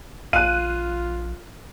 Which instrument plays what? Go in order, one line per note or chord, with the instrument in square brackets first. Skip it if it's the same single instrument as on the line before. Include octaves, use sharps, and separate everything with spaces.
[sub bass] A#1 [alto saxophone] F4 [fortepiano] F5 [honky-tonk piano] F#6 D#7